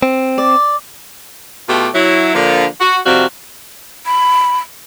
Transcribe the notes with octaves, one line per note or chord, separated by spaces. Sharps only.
C4
D5
B2 A3 F4 G4
F#3 E4
D3 F3 A#3
F#4
F2 C3 G3 F#4 C5 F5
B5